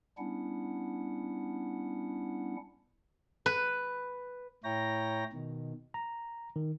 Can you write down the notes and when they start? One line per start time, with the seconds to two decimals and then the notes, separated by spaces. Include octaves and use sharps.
0.18 G3 B3 C#4 D4 E4 F#5
3.46 B4
4.64 A2 E4 C#5 G5 A#5 A#6
5.33 B2 D#3
5.94 A#5
6.56 D#3